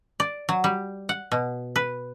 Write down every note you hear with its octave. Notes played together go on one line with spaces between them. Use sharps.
D5
F#3
G3
F#5
B2
B4